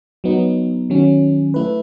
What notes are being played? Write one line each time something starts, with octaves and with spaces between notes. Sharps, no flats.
F#3 B3 D#4
D#3 F#3 C#4
A3 E4 B4